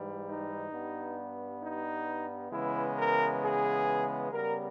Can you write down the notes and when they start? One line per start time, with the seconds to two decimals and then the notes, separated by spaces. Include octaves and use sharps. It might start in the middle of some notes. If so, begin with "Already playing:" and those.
Already playing: G#2 E3 G3
0.26 D#4
0.71 G2 G3 B3
1.61 D#4
2.52 C#3 E3 G#3 B3 E4
2.97 A#4
3.42 G#4
4.32 C#3 G3 B3 A#4